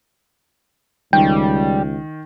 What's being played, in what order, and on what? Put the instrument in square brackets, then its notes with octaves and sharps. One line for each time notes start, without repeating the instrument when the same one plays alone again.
[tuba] C#2 [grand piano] D#3 [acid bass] G3 [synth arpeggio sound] G5